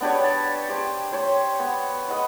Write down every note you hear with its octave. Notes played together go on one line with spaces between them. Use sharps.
B3 D4 G4 C#5
A5
G4 C5
C5 C#5 C6
B3
B4 D#5 F#5 C6